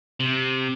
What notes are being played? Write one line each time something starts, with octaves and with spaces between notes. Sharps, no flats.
C3